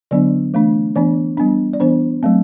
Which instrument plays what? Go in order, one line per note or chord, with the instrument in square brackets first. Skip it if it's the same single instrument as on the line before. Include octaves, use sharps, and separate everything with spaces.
[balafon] D3 F#3 B3 D4 D5
E3 A3 D4
E3 B3 D4 D5
G3 B3 D4
D5
E3 B3 D4 C5
F#3 A3 C4